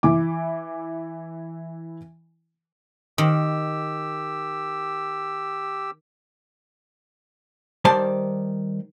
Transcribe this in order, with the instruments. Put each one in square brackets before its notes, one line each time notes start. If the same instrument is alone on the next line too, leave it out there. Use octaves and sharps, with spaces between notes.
[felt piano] E3 E4 D6
[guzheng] D#3 [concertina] G4 E6
[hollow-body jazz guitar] D#3 G3 C5 D5 A5